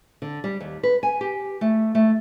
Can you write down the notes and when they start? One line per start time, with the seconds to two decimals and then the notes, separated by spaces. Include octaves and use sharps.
0.22 D3
0.44 G3
0.60 D#2
0.83 B4
1.03 G#5
1.21 G4
1.61 A3
1.95 A3